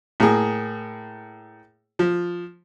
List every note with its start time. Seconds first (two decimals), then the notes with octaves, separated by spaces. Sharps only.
0.20 A2 A#3 G#4
1.99 F3